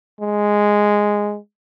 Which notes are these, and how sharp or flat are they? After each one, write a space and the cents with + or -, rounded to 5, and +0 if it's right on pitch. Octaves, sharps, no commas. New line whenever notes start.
G#3 -5